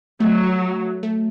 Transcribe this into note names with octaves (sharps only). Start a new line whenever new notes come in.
F#3 A3
A3